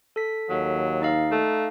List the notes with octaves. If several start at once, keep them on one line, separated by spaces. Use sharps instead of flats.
A4 B6
D#2 F#3
D#4 D#5 F5
A3